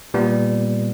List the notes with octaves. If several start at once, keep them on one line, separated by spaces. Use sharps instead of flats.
A#2 G3 B3